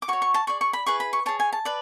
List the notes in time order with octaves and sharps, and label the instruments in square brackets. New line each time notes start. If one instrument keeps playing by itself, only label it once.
[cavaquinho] D6
F#4 C#6
C#5
C#6
A5
G#4 D5 C#6
C#6
B5
E4 G#4 B4 C#6
B5
C#6
G#4 C#5 A5
G#5
A5
B4 D5